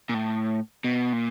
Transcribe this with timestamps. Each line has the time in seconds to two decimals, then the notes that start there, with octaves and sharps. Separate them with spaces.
0.09 A#2
0.14 A2
0.84 B2
1.13 A#2